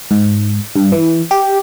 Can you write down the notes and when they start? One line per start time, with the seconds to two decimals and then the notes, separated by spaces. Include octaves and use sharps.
0.11 G#2
0.76 G2
0.92 E3
1.31 G4